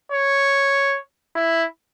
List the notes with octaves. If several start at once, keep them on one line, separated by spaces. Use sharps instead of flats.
C#5
E4